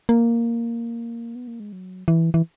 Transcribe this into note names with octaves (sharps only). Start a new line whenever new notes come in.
A#3
B3
A#3
G#3
F#3
E3
E3